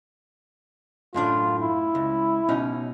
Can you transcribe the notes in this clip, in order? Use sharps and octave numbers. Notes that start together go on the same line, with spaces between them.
F#2 A2 D4 F4
E4
C#2
B2 C#4 D#4